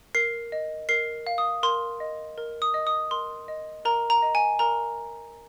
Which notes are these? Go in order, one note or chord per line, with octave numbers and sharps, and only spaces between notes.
A#4 C7
D#5
A#4 C7
F5
D#6
A#4 C6
D#5
A#4
D#6
D#5
D#6
A#4 C6
D#5
A#4 A#5
A#5
D#5
G#5
A#4 A#5